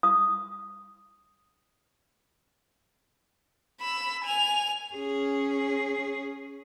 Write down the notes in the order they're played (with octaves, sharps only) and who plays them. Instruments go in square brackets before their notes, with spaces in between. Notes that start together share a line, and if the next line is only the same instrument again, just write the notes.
[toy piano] D#6
[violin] B5 E6
G#5 F7
[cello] C#4 G#4